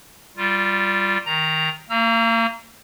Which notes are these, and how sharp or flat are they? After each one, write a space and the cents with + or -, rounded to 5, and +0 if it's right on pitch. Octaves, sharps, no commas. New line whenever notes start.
G3 -5 F4 +0
D#3 +15 A#5 +0
A#3 -35 A#5 +0 E6 +45